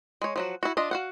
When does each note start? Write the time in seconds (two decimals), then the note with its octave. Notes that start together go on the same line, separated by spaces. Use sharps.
0.22 G#3 C#5
0.36 F3 F#3 F#4
0.63 E4 F#4
0.77 D4 F4 D#5
0.91 F#4 F5 F#5